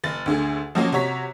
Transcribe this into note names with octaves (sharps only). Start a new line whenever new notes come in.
F#1 A6
D2 D3 G#4
F3 F#3 A#3 C#4
C3 F#4 C#5 A#5 B6